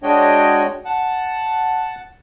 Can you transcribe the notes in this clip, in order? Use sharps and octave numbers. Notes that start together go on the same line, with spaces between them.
G#3 D4 F#4 C#5 D#5 G5
F#5 A5